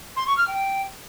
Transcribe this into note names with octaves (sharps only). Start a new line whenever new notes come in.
C6
C#6
F6
G5